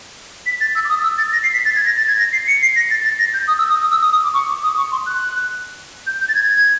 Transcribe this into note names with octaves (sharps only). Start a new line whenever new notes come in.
B6
A6
E6
D6
D#6
E6
A6
A#6
C7
B6
A6
G#6
A#6
A6
G#6
A#6
C7
C#7
C7
A#6
A6
A6
A#6
G6
D#6
E6
D#6
D#6
E6
D#6
D#6
D6
C#6
D6
D#6
C#6
C6
F#6
G6
G6
A6
G#6
G#6